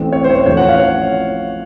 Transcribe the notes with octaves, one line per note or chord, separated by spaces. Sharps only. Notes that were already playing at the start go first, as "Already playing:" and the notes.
Already playing: A1 A2 A3 C4
C#5
C5
C#5
C5
A1 A2 F3 A3 C#5
F#5
F5
C#5